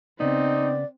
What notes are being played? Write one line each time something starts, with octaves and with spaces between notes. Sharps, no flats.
C#3 B3 C4 D#4 D5